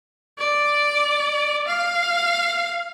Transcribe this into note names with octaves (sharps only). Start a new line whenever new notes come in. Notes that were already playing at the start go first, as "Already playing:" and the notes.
D5
F5